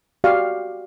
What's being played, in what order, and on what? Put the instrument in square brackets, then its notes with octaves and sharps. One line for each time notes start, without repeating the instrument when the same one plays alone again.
[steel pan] F#4 G4 D5 F5 C#6